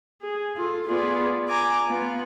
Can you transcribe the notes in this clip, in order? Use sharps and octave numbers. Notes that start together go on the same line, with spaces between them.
G#4
F4 A4
B3 F4 G#4 B4 D5
G#5 A#5 D6
B3 F4